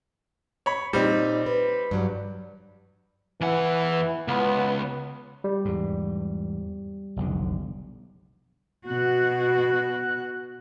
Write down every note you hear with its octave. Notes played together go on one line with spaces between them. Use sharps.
C#5 B5
A#2 G3 C4 D#4
B4
G2 F#3 G3
E2 E3 F#5
C#2 B3
G3
E2 G#2
F1 B1 D3
B2 F#4 F#6